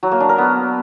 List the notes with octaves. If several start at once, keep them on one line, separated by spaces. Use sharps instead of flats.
F#3
A#3
D4
A#4
B3